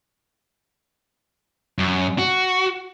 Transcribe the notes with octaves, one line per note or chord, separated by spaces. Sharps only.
F#2
F#4